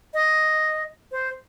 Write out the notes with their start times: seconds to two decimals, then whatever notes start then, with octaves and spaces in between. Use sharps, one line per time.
0.14 D#5
1.12 C5